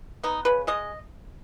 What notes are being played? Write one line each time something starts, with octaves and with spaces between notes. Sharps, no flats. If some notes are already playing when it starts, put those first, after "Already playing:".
B3 D#4
C#3 B4
G#3 D#5